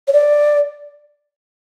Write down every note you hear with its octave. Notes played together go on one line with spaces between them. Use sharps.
C#5
D5